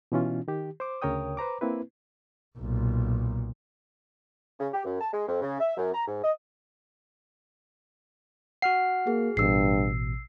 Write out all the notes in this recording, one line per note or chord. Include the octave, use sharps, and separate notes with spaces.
B2 E3 C#4 F4
D#3 G4
C5 D6
D2 C#3 A#4 C#5 G5 D#6
B4 C5 A#5 D6
A#3 C4 E4 B4
B1 A#2
C#3
G4
F#2
A5
G#3
F2
C#3
E5
F#2
A#5
G#2
D#5
F#4 F#5 F6 C7
A#3 G#4
A1 G2 B2 E6 C7